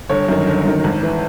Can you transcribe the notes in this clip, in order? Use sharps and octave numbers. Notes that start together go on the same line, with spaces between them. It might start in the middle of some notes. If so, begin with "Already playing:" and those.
G1 C#5
F#2 D#3
G1
F#2 D#3
G#1
E3